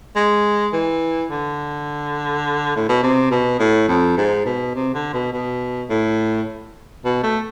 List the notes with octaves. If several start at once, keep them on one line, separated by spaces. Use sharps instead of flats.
G#3
E3
D3
A2
B2
C3
B2
A2
F2
G#2
B2
C3
D3
B2
B2
A2
B2
A3